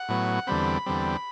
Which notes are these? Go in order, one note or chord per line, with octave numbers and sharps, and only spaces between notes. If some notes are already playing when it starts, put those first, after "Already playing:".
Already playing: F#5
A2 F#3 B3
E2 D3 G3 C4 B5
E2 D3 G3 C4